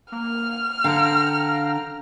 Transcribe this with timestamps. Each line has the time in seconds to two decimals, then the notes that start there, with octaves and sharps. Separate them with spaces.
0.12 A#3 F6
0.84 D3 F5 G5 A#5